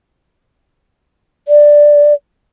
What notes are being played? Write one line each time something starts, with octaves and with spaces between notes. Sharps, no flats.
D5